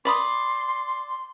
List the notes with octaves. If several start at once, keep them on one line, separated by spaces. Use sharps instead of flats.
D5 B5 C6 D#6